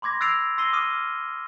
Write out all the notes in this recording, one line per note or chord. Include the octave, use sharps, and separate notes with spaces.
B5 C6 D6 G#6 A#6
E6 F#6 A6 C7 D7 F7
C6 E6 A#6 C7 D#7 G7
D6 D#6 F6 C7 D#7